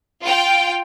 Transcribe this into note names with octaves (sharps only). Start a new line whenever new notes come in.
F4 G5